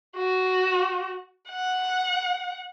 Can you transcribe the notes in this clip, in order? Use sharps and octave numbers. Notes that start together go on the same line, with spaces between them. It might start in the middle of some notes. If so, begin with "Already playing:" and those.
F#4
F#5